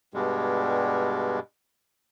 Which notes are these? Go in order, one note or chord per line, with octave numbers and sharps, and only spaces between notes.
G2 B2 G3 G#3